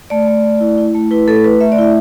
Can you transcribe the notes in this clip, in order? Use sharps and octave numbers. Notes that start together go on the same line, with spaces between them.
A3 D5
A3
A3
E4
E4
A3
E4 B4
A3 A4
A3 B4
A3 E5
D5
E4 E5